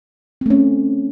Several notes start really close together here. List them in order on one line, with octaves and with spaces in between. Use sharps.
C4 A3 C#4